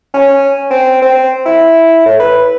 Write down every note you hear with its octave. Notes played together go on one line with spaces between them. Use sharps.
C#4
C4
C4
E4
A2
B4